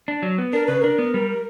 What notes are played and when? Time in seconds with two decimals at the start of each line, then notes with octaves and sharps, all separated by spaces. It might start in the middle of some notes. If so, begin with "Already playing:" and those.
0.08 D4
0.23 F#3
0.38 B3
0.53 D4 A#4
0.67 C#3 B4
0.81 D4 A#4
0.98 B3
1.14 G3